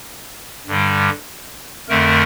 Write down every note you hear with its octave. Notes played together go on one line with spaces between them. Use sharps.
G2 D3 G3
F2 D3 A3 A#4